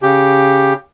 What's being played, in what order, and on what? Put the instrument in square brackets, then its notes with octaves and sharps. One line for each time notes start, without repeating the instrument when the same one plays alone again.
[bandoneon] C#3 G4